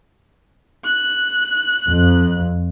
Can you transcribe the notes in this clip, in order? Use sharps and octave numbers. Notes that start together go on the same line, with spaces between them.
F#6
F2